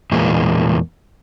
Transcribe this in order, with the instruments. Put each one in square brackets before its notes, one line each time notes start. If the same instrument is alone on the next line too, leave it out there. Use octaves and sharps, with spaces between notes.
[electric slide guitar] E2 A#2 G#3 A#3